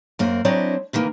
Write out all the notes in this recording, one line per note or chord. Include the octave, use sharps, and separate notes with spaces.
F#2 A#3 C4
F#3 C4 D4 E4 C#5 D#5
C3 D#3 E3 A#3